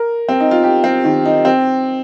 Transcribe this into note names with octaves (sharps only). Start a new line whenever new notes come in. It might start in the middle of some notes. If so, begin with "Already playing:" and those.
Already playing: A#4
C4
D#4
F4
G4
C4
D#3
D#4
C4